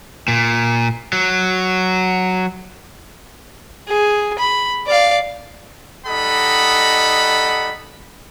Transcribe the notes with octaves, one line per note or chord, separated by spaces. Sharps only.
A#2
F#3
G#4
B5
D5 F5
G3 D#4 A4 D#5 F#5 B5